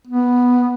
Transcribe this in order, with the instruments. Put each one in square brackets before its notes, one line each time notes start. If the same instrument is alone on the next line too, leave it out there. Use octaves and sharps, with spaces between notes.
[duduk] B3